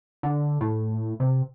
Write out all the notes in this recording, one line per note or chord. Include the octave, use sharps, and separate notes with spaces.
D3
A2
C3